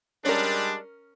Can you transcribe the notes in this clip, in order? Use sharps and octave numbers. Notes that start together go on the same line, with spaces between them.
G3 G#3 C#4 D4 A#4